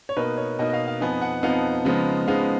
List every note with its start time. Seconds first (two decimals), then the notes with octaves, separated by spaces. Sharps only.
0.09 C#5
0.16 B2 A#3 D#4 B4
0.37 C#5
0.59 B2 A#3 D#4 D#5
0.69 D#5
0.74 F5
0.88 F5
1.01 F2 F3 B3 D#4 G#5
1.22 F#5
1.43 F2 F3 B3 D#4 F5
1.85 C#3 F3 G#3 B3 D#4
2.27 C#3 F3 G#3 B3 D#4 F5